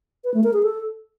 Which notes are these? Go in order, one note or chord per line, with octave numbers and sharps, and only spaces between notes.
B4
A3
A#4
G#4
A4